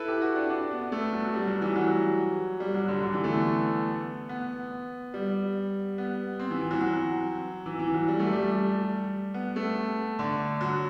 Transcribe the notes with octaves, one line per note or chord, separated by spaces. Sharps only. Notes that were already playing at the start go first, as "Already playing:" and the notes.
Already playing: E4 A4 B4
G4
F#4
D4
D4
B3
A3
F#3
G3
F#3
E3
F#3
G3
F#3
D3
D3
E3
A3
B3
B3
G3
B3
C4
E3
E3
F#3
F#3
E3
E3
F#3
G3
A3
G3
G3
B3
A3
D3
F#3